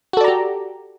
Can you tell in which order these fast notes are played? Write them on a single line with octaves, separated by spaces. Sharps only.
F#4 A4 D5 A#5 G4